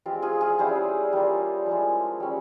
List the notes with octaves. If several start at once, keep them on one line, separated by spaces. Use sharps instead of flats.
G#3 C4 F4 G4
F4 G#4
F4 G#4
G3 C#4 E4 G#4 C5
G3 A#3 F4
F3 G#3 E4
G3 C#4